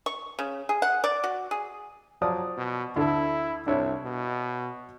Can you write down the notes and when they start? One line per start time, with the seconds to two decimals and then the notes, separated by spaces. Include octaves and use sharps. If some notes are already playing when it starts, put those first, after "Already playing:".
0.06 C#6
0.39 C#3
0.69 G#4
0.82 F#5
1.04 D5
1.24 F#4
1.51 G#4
2.22 F3 F#3 D5 D#6
2.57 B2
2.96 D2 E4 A4
3.67 C2 D4 E4 C#5
4.04 B2